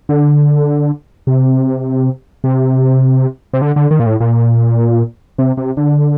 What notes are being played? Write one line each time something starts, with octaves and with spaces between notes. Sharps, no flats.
D3
C3
C3
C3
D3
D3
D#3
A#2
A2
A#2
C3
C3
D3